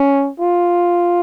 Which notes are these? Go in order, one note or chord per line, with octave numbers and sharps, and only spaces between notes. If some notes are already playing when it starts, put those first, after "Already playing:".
Already playing: C#4
F4